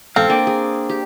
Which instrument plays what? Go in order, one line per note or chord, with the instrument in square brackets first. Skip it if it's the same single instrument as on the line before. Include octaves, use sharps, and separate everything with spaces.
[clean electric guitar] E2 G#2 F5 [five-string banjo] C4 [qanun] A4
[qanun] A#3 [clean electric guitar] D4 D5 G5
[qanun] G#4
G4